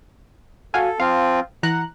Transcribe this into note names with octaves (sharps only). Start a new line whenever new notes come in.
F#4 A4 F5 G#5
F3 C4 F4 F5
E3 F#5 A#5 F#6